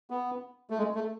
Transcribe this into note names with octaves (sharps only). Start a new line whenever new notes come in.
B3
A3
G#3
A3